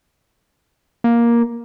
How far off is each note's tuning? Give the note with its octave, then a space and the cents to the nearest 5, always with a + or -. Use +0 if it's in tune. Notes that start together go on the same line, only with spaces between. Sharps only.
A#3 +10